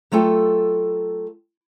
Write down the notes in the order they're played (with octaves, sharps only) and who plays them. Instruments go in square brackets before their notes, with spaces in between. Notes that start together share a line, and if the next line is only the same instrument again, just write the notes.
[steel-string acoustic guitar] F#3 A3 F4 A4 G5